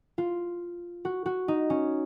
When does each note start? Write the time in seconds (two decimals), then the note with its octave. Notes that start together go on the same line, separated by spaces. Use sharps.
0.18 F4
1.05 F#4
1.26 F#4
1.48 D#4
1.70 C#4